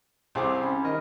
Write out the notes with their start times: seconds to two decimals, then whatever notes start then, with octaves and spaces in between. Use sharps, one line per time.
0.35 C2 C3 G#4 C5 D6
0.63 C#4 B5
0.84 D#3 A#4 D#5